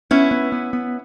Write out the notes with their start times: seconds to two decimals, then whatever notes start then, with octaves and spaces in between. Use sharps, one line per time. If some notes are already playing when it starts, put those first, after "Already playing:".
0.11 B3 C#4 E4
0.31 B3
0.52 B3
0.73 B3